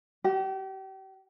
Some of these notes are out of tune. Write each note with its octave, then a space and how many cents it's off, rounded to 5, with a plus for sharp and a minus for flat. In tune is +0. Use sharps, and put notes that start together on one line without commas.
G4 -35 F#5 +0